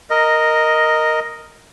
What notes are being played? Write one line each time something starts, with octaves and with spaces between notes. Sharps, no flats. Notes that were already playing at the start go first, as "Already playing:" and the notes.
A#4 D#5